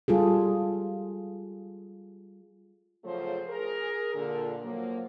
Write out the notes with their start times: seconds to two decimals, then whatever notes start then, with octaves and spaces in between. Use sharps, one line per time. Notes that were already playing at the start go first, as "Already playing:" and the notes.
0.08 G3 F4 G#4 A4
3.04 C#3 F3 F#3 A3 C5
3.49 G#4 A#4
4.14 A#2 D3
4.63 F3 F#3 A#3